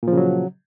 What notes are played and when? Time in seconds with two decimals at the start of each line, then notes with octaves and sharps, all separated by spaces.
0.03 A#2
0.08 F3
0.13 C#3
0.17 F#3